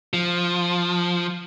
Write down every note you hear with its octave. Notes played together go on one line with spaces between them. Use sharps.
F3